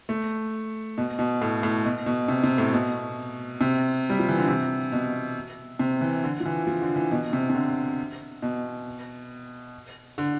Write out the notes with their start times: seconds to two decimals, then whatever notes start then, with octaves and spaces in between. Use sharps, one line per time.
0.09 A3
0.98 B2
1.19 B2
1.42 A2
1.63 A2
1.85 B2
2.06 B2
2.28 C3
2.43 C3
2.58 A2
2.73 B2
3.61 C3
4.10 G3
4.19 F3
4.29 E3
4.38 D3
4.48 C3
4.92 B2
5.79 C3
6.01 E3
6.24 D3
6.40 F3
6.45 E3
6.67 F3
6.82 D3
6.96 E3
7.12 B2
7.33 C3
7.50 C3
7.55 D3
8.42 B2
10.18 D3